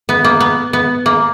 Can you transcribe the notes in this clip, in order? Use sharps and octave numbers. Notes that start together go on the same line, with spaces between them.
B3
A#3
B3
B3
A#3